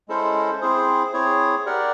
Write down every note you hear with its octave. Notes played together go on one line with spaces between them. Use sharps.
G#3 C#4 E4 A4 C5
C4 E4 G#4 C5
C4 E4 G#4 C#5
G4 A#4 D5 F#5